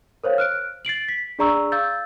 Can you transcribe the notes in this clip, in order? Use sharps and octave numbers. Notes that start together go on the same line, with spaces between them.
A#4 C5 C#5 F5
F6 F#6 D7
A6 C7 D7 F#7
B6
D4 G#4 D5 A#5 C#6 E6
F5 E6 G6 A6